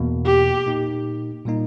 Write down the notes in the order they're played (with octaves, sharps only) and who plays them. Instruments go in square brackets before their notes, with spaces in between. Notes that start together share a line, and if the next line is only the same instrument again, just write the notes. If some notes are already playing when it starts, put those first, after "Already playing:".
Already playing: [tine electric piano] E2 B2 A#3
[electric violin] G4
[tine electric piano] A#2 A#3 D#4
A#2 G3 A#3 D#4